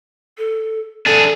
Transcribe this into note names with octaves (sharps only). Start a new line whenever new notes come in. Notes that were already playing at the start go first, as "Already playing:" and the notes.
A4
D4 G#4 A4